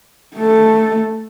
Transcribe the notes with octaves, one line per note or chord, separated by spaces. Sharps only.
A3 A4